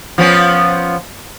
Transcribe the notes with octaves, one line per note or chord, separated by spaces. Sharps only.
F3 B3 C#4